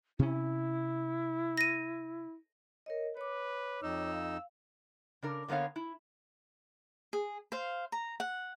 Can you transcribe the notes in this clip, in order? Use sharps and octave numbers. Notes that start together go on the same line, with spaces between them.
C3 C#4 E4
A#6 D#7
A#4 C#5 D#5
B4 C#5 D6
F2 D#4 E6
F5
C#3 D4 A#4
D3 A#3 B3 C#5 F5
E4
G#4
C5 F5
A#5
F#5